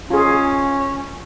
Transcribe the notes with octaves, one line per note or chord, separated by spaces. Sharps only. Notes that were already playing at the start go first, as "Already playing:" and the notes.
C#4 F4 G#4